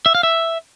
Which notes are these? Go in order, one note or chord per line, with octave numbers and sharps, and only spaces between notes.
E5
F5
E5